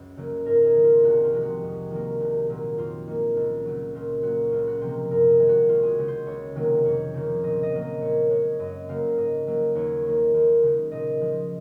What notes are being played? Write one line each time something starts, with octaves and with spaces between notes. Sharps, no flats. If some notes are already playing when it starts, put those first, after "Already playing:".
Already playing: C#2 F#2
C#3 F#3 A#3
G#2 A#4
G#4 A#4
D#3 G#3
F4
C2 F#4
F4
C3 F3 G#3
F#4
F2
D#3 A#3
C2
A#2 F#3 A#3
F2 F4
D#3 A#3
C#2
C#3 F#3
A#2 F4
F#3 A#3 F#4
C#2 F4
F#4
C3 F3 A#3 C5
F#2 A#4
G#4
D#3 G#3
F#4
C#2 F4
F#4 G#4
C#3 G#3
C5
C#2 C#5
C3 D#3 F#3 A#3
F2 C#5
C#3 F3 A#3
A#2 D#5
D#5
F#3 A#3
D#5
A#2 C#5
G#3 C#5
F#2 D#5
C#3 F#3 A#3 F5
G#2 D#5
F#3 A#3
D#2 C#5
D#3 A#3
D#2
C#3 G#3
A#2 D#5
F3 G#3